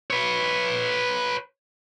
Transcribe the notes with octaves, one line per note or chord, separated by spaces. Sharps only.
B4 C#5